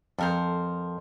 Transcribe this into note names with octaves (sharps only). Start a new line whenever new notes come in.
F2 A4 A#4 C5